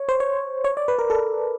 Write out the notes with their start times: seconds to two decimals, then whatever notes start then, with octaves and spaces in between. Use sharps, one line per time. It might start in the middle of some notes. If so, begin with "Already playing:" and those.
Already playing: C#5
0.09 C5
0.20 C#5
0.64 C#5
0.77 D5
0.88 B4
0.99 A#4
1.10 A4